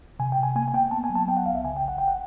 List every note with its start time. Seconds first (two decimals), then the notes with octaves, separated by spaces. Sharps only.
0.19 C3 G#5
0.32 G5
0.38 C3 G#5
0.56 A#3 G#5
0.68 G#5
0.74 A#3 G5
0.91 B3 A5
1.04 G#5
1.10 F#3
1.15 A5
1.28 B3 G5
1.37 F#5
1.45 C2 F5
1.55 E5
1.64 C#3 G#5
1.77 G5
1.82 G1
1.88 F#5
1.98 G1 G5
2.08 F#5